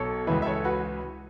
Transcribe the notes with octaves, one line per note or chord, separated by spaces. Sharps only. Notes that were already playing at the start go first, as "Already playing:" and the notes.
Already playing: B1 B2 A4 C#5
C#2 C#3 E3 B4 E5
E5
A4 C#5
F#4 B4